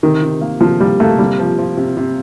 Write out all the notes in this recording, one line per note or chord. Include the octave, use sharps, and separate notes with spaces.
C3 D#3
C3
A#3
C3 F3
G3 A#3
A3 A#3
C3 G3
F3
F3
C3
C3